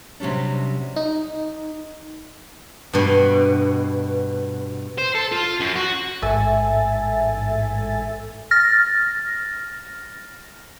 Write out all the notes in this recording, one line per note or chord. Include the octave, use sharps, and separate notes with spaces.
C3 F#3 G3 C#4 D4
D#4
G2 B2
C5
A4
F4
F#2
F#4
A1 G#2 A4 E5 G#5 A6
F6 A6 A#6